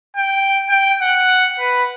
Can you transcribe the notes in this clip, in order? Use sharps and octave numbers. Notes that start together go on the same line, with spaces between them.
G5
G5
F#5
B4